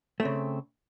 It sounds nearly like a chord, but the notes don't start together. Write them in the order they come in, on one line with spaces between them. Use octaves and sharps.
A3 C4 C#3